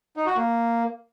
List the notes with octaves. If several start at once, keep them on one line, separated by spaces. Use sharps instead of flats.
D#4
F#4
A#3